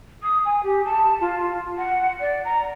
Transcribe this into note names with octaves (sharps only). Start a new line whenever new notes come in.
D#6
G#5
G4
A5
F4
F#5
D5
A#5